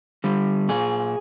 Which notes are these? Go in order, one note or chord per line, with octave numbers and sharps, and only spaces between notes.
D3 G3
A#2 G#4